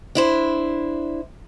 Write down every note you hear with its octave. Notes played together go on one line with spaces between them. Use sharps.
D4 E4 C5